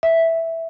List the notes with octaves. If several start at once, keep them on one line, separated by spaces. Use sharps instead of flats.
E5